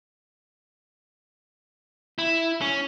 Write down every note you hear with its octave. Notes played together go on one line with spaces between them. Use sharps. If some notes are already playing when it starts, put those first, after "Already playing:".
E4
C#4